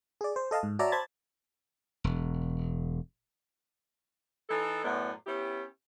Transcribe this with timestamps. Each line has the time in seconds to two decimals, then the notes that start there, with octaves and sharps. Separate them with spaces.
0.21 G#4 D5
0.36 C5
0.51 A4 D#5 F5 A5
0.63 G#2
0.79 F#4 C#5 D5 E5 A5 A#5
0.92 C5 A5 B5 G#6 A6
2.04 E1
4.50 E3 D#4 A4
4.84 F#2 A2 A3 B3 D5
5.27 B3 C#4 E4 G4